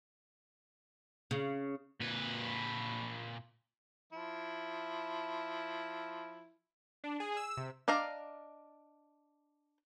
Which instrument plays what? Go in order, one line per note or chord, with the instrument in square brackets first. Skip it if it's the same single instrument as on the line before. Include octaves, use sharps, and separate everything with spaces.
[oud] C#3
[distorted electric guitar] A#2 B4
[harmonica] F3 E4
[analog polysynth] D4
G#4
E6
C3
[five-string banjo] D4 D5 D#5 F5 A#5